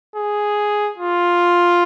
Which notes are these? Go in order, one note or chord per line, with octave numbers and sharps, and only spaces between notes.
G#4
F4